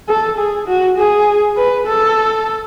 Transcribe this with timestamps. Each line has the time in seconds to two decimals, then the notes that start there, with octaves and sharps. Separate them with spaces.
0.09 A4
0.38 G#4
0.68 F#4
0.97 G#4
1.57 B4
1.87 A4